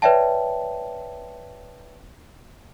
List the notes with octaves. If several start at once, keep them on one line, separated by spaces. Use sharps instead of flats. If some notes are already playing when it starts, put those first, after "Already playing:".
B4 C#5 D5 E5 G5 A5